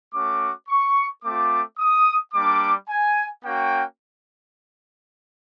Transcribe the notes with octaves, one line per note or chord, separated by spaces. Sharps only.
A3 C#4 F#4 D6
C#6
A3 C4 F4 D6
D#6
G3 A#3 D4 D6
G#5
A#3 C#4 F#4 G5